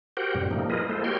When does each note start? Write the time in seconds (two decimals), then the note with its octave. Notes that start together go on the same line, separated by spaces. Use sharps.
0.17 F#4 G4 A#4 C5 F#5 G5
0.34 F#2 A2 C3 G3
0.51 F3 G3 A3 A#3 D#4
0.70 E4 F4 G#4 A#4 B4 D#5
0.89 G#3 A#3 E4 A4 C5
1.04 F#4 G4 A#4 C#5 G5 C6